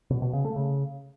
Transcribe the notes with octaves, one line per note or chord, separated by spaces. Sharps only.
B2
B2
C#3
A3
C#3